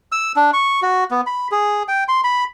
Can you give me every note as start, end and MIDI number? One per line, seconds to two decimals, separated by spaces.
0.12 0.32 88
0.36 0.51 62
0.53 0.80 85
0.82 1.04 66
1.11 1.21 59
1.26 1.48 83
1.51 1.83 68
1.88 2.04 79
2.08 2.21 84
2.24 2.44 83